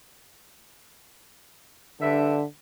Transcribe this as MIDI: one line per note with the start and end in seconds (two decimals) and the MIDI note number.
2.00 2.38 43
2.00 2.43 50
2.00 2.38 76